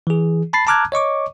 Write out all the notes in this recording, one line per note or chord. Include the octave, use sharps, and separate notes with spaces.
E3 G#4
A5 B5 A6 C7
A5 A#5 D6 F6 F#6 G#6
C#5 D#5 C#6 D6